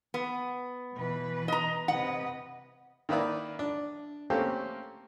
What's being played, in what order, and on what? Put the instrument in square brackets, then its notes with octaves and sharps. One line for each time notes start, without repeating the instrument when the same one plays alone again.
[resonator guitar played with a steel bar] B3
[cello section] B2 E3 B4
[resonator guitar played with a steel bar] D#5 A#5
[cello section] C3 B4 D#5 [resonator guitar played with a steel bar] F#5
[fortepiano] D#3 A#3 E4 B4 D5
D4
A3 A#3 C4 C#4 G4 A4